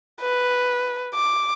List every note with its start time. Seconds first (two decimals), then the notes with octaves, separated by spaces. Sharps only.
0.21 B4
1.14 D6